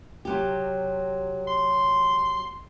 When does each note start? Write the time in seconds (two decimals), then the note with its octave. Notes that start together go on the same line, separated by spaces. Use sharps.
0.25 C3 F#3 G4
1.48 C6